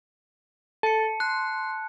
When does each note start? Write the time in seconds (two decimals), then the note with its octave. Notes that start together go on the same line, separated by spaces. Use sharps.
0.83 A4 A5 C#7
1.20 C6 F#6